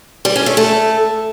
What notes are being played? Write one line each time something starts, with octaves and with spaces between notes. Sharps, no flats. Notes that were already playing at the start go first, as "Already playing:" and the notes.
G3
C#4
A3
A3